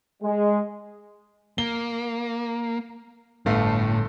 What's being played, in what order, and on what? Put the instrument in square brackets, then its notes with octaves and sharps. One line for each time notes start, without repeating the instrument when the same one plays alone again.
[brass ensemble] G#3
[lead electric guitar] A#3 [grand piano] G7
[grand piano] G1 A3 F5 [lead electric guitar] A2